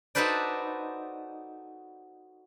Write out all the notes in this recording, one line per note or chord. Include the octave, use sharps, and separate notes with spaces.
D#4 F#4 A4 B4 C5 D5